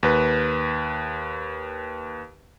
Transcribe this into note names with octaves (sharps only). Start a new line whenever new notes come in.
D#2 B4